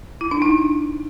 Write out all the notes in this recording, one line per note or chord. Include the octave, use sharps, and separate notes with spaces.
E4
D4
D#4